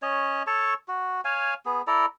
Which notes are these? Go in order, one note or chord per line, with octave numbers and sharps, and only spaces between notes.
C#4 C#5 D#5
A4 C#5 A5 C#6
F#4
C#5 F5 G#5
B3 G#4
E4 A4 D5 A#5